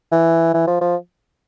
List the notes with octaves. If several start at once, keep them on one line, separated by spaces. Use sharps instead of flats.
E3
E3
F3
F3